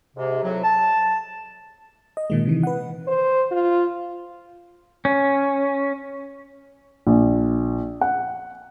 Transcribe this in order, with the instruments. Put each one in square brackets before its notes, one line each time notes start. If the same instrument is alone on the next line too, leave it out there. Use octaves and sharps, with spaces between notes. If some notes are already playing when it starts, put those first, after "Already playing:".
[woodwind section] G#2 C3
F2 A2 C3 F#3
A5
[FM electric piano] D#5
A#2 D#3 G#3
C3 D#3 E3
B4 F#5
[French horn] C5
F4
[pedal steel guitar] C#4
[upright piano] A#1
F#5